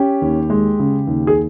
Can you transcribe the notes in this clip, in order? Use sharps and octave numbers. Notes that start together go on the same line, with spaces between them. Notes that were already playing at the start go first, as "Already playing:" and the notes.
Already playing: C#4 G4
D#2
G#3
C#3
D#2
G#4